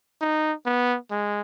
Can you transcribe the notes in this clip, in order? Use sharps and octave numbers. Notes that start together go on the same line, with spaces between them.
D#4
B3
G#3